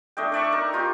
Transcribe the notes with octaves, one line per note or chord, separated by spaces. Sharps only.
A3 D4 D#5 G5
D4 D5 E5 C#6
D#4 A#4
D#4 F4 G4